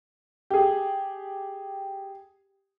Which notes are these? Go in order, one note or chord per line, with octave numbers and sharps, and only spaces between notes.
G4 G#4